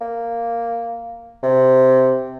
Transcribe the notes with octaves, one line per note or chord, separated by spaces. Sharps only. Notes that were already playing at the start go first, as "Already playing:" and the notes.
A#3
C3